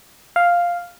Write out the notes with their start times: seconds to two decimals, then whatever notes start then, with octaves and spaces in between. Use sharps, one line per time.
0.36 F5